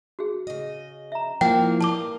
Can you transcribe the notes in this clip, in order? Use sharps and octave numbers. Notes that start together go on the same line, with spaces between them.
F#4 G#4
C#3 D#5
E5 A#5
E3 F3 A#3 G5
G2 A#3 A5 D6